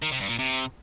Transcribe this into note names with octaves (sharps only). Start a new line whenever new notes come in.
D#3
C3
G2
A#2
C3